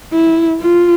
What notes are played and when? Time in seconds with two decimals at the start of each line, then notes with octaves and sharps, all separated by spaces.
0.13 E4
0.60 F4